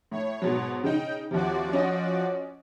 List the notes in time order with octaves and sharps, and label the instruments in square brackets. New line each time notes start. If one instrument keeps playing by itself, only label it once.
[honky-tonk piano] A2 [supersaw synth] C#5
[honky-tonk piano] G#2 B2 F#3
[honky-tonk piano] C#3 D#4 [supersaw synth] G5
[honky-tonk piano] D#2 C3 [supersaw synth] F3 F#4 D5
[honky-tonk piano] C#4 D#5